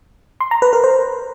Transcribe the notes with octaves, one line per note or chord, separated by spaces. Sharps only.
C6
A#5
B4
A#4
C5